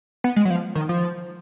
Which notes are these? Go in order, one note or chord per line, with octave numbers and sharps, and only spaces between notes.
B3
G#3
F#3
F3
D#3
F3